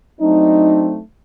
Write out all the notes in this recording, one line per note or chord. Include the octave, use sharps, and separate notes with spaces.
F#3 A3 C4 D4 D#4